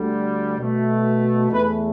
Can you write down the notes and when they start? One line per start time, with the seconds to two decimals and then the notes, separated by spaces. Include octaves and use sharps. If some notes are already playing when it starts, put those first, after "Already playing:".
Already playing: D2 D3 G3
0.58 B2 A3
1.50 E2 E3 A3 B4